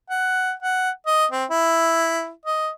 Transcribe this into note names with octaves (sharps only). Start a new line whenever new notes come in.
F#5
F#5
D#5
C4
E4
D#5